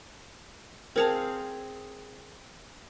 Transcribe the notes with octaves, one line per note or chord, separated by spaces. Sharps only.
C4 G#4 A#4 C5 F5 A5